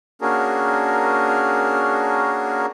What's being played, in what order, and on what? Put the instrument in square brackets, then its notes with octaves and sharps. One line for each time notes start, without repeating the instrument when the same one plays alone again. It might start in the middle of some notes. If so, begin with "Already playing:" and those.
[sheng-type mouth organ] A#3 C#4 D4 F#4 G#4 A#4